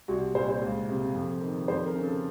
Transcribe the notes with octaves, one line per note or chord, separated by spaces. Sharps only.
C2 F#4
A#2 C5
C5
C#2
C3
F2
D#3
F2 C5
A#4
C#3
A4